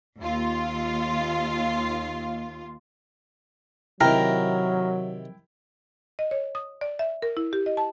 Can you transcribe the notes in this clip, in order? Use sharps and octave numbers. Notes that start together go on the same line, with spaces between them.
D#2 F4
C3 D#3 F#3 E4 A#4 G5
D#5
C#5
D#6
D5
E5
A#4
E4
G4
D#5
A5